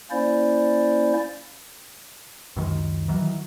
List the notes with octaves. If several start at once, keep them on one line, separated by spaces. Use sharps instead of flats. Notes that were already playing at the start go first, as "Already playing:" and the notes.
A#3 C#4 E4 C5 D5
C#2 F#2 D#3
D#3 E3 F#3